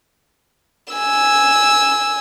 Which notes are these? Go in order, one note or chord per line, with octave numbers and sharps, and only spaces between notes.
G#5 E6